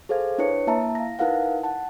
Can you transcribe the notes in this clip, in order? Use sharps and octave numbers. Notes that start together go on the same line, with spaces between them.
G#4 A4 C5 F5 G#6
D4 E4 B4 C#5 C#7
A#3 E4 E5 A5 A#5
F5 A#6
D#4 E4 A#4 B4 F5 F#5
F#5 A5